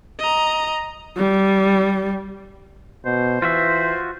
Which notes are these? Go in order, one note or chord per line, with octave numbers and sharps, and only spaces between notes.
D#5 A#5
G3
B2 C5
E3 F4 F#4 E5